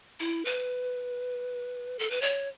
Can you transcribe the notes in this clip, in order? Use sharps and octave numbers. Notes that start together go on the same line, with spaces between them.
E4
B4
A4
B4
C#5